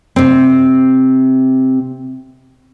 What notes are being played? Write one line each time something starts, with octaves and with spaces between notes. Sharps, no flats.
C3 C4